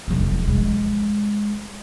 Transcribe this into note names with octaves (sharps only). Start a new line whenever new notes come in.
E1 F3
G#3